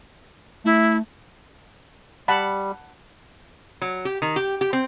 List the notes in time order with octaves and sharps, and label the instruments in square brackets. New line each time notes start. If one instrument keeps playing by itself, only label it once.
[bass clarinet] A3 [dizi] E4
[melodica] G3 [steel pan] F#5 A5 B5
[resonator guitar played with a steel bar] F#3
G4
D#3
G4
G4
C4